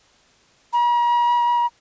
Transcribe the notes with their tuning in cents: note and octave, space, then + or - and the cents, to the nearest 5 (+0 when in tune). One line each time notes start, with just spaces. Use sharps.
A#5 +45